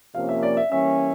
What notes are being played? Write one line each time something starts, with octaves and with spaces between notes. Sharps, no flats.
C3 F3 A#3 C#4 F5
E5
D5
E5
E3 G3 A#3 C#4 E5